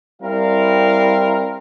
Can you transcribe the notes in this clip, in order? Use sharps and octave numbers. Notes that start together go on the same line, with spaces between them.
G3 C4 E4 A#4 F5